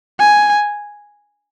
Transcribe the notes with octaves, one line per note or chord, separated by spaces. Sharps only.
G#5